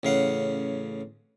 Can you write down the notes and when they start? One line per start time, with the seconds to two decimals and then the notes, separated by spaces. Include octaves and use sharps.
0.03 A1 C#3 F5 F#5